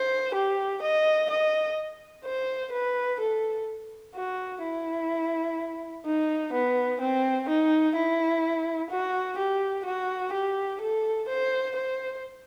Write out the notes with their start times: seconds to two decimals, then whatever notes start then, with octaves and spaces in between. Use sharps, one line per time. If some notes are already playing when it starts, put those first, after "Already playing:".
Already playing: C5
0.34 G4
0.82 D#5
1.30 D#5
2.25 C5
2.72 B4
3.20 A4
4.15 F#4
4.63 E4
6.06 D#4
6.53 B3
7.01 C4
7.49 D#4
7.95 E4
8.90 F#4
9.38 G4
9.85 F#4
10.33 G4
10.81 A4
11.28 C5
11.76 C5